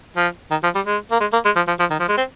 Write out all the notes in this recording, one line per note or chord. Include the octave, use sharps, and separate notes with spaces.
F3
D#3
F3
G3
G#3
A#3
G#3
A#3
G#3
F3
F3
F3
D#3
F3
G#3
C4